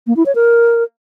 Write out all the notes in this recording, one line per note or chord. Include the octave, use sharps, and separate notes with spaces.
A#3
E4
C#5
A#4